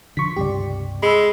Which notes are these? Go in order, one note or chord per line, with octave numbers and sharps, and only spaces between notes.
D3 F3 C6 C#6 B6
C#2 G2 C3 G4 D5
G#3 B5 E6